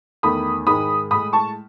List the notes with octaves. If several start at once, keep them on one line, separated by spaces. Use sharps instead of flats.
E2 D#3 A3 B5 D#6
G#2 D#3 G#3 B5 D#6
A2 G#3 B5 D#6
A5 C#6